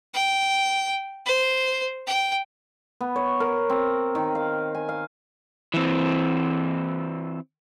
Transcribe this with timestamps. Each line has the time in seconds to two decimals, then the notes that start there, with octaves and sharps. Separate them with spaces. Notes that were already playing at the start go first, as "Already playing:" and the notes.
0.14 G5
1.26 C5
2.06 G5
3.01 B3
3.16 C#5
3.40 A#4
3.70 C4
4.15 D#3
4.35 F5
4.75 G#5
4.89 F5
5.74 E3 C4